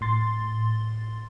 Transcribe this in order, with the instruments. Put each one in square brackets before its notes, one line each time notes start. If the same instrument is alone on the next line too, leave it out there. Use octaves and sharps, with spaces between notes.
[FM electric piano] A2 C6 A6